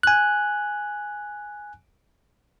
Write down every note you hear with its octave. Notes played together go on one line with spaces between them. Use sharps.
G#5 F#6